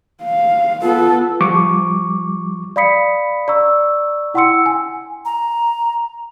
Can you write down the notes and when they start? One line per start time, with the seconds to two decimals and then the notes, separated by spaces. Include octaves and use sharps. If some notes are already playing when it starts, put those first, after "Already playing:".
0.22 F5
0.82 B3 F4 A4
1.41 F3 G3 C#6 D6
2.76 D5 F5 B5 D#6 B6 C#7
3.48 D5 A#5 C#6 E6
4.34 E4 F#5 G5 C6 E6 C#7
4.66 G#5
5.25 A#5